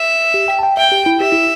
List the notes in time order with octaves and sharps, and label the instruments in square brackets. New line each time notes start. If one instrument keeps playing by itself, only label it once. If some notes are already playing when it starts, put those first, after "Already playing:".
Already playing: [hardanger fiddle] E5
[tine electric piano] G4
G5
A5
G5
[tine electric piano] E5 [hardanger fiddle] G5
[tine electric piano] G4
E4
[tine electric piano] G4 [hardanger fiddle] E5
[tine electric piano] E4